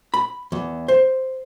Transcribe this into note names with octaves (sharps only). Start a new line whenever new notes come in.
B5
E2
C5